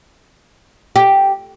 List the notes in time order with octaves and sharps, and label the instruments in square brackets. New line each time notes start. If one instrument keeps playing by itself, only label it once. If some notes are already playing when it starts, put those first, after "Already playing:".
[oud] G4